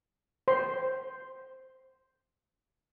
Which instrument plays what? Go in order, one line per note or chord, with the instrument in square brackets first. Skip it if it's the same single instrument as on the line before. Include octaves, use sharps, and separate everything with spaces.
[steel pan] C5 C6